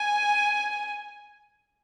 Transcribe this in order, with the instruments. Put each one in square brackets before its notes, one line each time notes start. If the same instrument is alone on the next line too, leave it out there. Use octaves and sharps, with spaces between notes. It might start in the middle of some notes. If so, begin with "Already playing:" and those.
Already playing: [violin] G#5